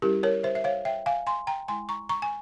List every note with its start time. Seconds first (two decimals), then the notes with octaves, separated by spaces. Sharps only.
0.02 G3 C#4 E4 G4 A#4
0.23 A#4 C#5
0.44 C5 E5
0.55 E5
0.64 C#5 F5
0.85 E5 G5
1.06 F5 G#5
1.27 G#5 C6
1.47 G5 A#5
1.68 G#3 E4 G#5 C6
1.89 A#5 C#6
2.09 A#5 C#6
2.22 G#5